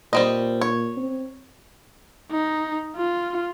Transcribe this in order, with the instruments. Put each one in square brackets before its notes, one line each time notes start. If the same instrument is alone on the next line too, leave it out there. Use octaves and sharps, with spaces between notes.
[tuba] A#2 [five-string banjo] G3 C4 D#5
[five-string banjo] C#5
[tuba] C4
[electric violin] D#4
F4